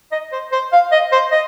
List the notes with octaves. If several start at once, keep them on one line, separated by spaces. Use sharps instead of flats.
D#5
C5
C5
F5
D#5
C5
D#5